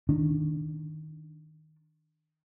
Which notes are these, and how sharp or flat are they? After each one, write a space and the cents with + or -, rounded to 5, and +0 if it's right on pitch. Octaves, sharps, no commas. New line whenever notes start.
D#3 +0 D4 +0